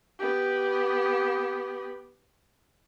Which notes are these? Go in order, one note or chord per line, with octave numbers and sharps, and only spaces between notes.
B3 G4